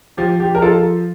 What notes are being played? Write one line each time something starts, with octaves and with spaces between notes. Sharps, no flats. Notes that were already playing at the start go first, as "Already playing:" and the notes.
F3 G4
F3 G4
A#4
F3 F4 A4